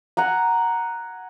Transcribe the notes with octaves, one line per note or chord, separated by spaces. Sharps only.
F#5 G#5 A#5